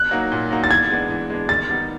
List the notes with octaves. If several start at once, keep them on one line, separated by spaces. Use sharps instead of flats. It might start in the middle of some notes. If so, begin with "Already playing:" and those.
Already playing: F#6
F#3 A#3 D#4 F#4
A#2
F#3 A#3 D#4 F#4
A6
E3 G#6
G#3 B3 D4
E3
G#3 B3 D4
D#3 A6
G3 B3 D#4